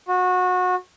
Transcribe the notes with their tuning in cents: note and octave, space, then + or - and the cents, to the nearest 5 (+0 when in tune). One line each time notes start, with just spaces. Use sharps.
F#4 -25